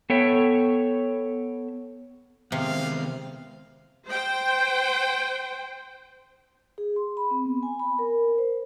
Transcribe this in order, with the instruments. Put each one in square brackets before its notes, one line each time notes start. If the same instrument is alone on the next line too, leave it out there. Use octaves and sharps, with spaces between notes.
[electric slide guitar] B3 A4 C#5 E5 G5
[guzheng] C3 [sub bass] D#3 [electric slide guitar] G#3 B3 [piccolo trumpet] F5
[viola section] C5 G5
[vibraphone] G#4
C6
B5
C4
B3
G#5
B5
A#4
C5